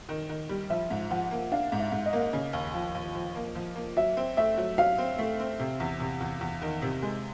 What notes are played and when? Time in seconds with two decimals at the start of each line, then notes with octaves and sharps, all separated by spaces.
0.09 D#3
0.29 D#3
0.49 G3
0.70 F3 E5
0.90 G#2
1.11 F3 F#5
1.31 A#3
1.52 D4 F5
1.72 G#2
1.79 E5
1.92 G#2
2.06 D#5
2.13 A#3
2.33 C#3
2.53 D#2
2.74 F3
2.95 D#2
3.15 F3
3.36 A#3
3.56 F3
3.76 A#3
3.97 F#3 E5
4.17 C4
4.37 A3 E5
4.57 F#3
4.78 F#3 F5
4.98 C4
5.18 A3
5.40 C4
5.60 C3
5.80 E2
6.00 C3
6.21 E2
6.41 E2
6.62 D#3
6.82 C3
7.02 G#3